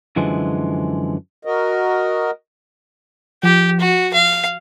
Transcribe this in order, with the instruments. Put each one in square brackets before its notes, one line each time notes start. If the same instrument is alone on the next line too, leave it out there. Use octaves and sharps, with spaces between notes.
[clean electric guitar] F#2 D3 E3 F3 G#3
[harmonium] F#4 A#4 D#5
[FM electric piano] F3 [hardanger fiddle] G4
[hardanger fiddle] F#4
F5